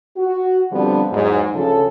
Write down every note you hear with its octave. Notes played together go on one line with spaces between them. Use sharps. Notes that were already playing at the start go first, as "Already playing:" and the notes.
F#4
D3 F3 G3 B3 C4 D4
E2 G#2 F#3
D2 C#3 F3 A4